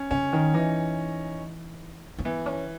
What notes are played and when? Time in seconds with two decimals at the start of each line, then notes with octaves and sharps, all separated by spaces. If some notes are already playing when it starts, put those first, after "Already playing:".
Already playing: C#4
0.11 C#3 C#4
0.33 D#3
0.54 E3 D#4
2.19 C#4
2.25 E3 B3
2.46 C#4